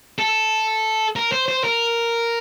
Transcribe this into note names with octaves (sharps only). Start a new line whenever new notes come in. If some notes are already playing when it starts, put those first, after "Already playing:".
A4
A#4
C5
C5
A#4